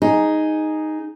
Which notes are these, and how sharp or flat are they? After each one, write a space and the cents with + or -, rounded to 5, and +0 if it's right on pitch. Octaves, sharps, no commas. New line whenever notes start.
D#4 +0 G#4 +0